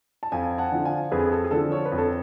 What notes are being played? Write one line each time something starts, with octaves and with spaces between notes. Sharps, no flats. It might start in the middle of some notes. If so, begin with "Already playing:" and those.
A5
F2 F5 G#5
F#5 A5
D3 F3
F5 G#5
F2 G#4 B4
A4
G#4
D3 F3 A4
C#5
B4
F2
A4